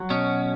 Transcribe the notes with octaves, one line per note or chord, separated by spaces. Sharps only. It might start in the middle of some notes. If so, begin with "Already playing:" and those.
Already playing: F#3
B2 C#4